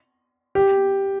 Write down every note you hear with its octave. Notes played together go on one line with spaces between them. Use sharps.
G4